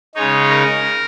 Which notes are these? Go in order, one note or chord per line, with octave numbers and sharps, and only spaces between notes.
C#3 G#3 D#4 C#5
A#4